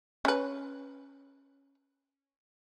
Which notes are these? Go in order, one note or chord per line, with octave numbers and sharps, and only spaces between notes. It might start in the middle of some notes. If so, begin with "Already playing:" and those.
C#4 B4